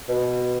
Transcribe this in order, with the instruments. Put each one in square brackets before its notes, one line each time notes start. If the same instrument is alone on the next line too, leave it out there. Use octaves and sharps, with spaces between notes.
[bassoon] B2